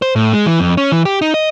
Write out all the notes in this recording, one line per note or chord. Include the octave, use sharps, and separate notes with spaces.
C5
A2
G#3
E3
F2
C#4
E3
G4
D#4
D#5